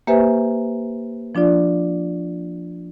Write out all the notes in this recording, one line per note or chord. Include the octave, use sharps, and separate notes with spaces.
A#3 G4 B4 C5 E5 G#5
F3 D4 F4 D5